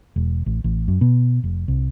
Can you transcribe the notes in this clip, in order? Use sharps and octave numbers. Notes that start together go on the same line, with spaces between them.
E1
A1
A1
F#2
B2
F1
C2